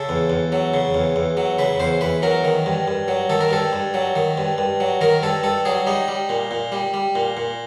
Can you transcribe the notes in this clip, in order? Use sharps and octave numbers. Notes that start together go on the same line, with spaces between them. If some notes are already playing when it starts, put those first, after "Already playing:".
Already playing: C#3 A4
E2
E2
F#3
C#3
E2
E2
F#3
C#3 B4
E2 C5
E2 B4
F#3 A#4
D#3
G2
G2
F#3
D#3 A4
A#4
G2 A4
G2
F#3
D#3
G2
G2
F#3
D#3 A#4
G2 A4
G2 A4
F#3 G#4
G3 D#4
G3
A#2
A#2
G3
G3
A#2
A#2